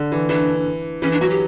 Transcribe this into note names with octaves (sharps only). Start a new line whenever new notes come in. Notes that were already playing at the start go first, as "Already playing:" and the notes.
Already playing: D3
E3
E3 D4
E3 C#4
D4
F#3 F#4
G4